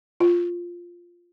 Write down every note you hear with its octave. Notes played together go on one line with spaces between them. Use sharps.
F4